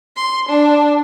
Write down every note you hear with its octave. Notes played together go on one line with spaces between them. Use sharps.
C6
D4